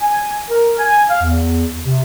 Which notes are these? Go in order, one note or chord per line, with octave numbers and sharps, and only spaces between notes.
G#5
A#4
G#5
F5
E2
C3